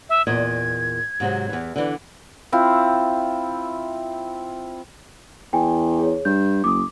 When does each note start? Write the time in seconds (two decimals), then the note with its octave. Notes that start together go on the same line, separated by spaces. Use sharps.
0.09 E5
0.27 E2 A#2 D#5 G#6
1.20 G#2 C3 F#3
1.49 E2 E3
1.76 D3 E3
2.52 C4 E4 F4
5.53 E2 G5 G#5
5.99 G#4 C#5
6.25 G2 G6
6.64 F#1 D6 D#6